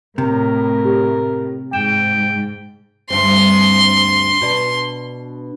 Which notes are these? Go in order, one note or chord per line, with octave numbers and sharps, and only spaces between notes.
A2 C3 A#4
G4
G#2 G5 E7
D2 G2 C4 C6
B2 D4